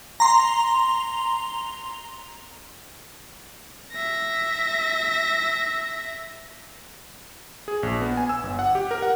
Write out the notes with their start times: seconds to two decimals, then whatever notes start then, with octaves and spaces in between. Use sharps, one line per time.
0.20 A#5 C6
3.92 E5 A#6
7.68 G#4
7.83 A#1
8.01 B3
8.17 G#5
8.29 E6
8.43 G1
8.59 F#5
8.75 G4
8.91 A#4
9.02 F#5